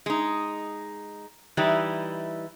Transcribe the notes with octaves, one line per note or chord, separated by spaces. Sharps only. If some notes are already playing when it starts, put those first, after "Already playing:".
G#3 D#4
E3 G3 D#4 E4